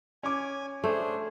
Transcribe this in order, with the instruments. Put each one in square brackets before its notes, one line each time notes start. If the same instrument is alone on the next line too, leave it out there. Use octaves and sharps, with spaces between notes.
[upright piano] C#4 D6 [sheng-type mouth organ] G#5
[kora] A3 [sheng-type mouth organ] D4 G#4 C5